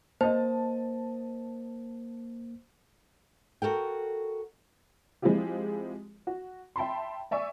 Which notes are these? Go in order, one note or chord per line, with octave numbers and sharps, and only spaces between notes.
A#3 C5 D#5 A5
F#4 A4 A#4 G5
F3 G#3 C4 E4 F4 G4
F#4
E5 G5 A5 B5 C6
D5 E5 G#5 C#6 E6